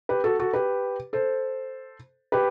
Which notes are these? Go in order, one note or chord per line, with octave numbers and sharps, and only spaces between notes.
G4 B4
F#4 A4
F#4 A4
G4 B4
A4 C5
G4 B4